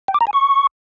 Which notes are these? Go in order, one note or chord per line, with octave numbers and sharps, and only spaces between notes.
G5
D6
A#5
G#5
C#6